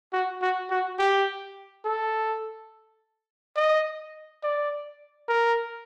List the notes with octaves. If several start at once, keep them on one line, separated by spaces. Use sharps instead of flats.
F#4
F#4
F#4
G4
A4
D#5
D5
A#4